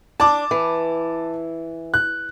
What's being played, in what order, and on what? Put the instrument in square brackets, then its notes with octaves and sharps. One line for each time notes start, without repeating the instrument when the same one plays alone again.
[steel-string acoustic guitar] D4 [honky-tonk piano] A5 D6
[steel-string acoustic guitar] E3
[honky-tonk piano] F#6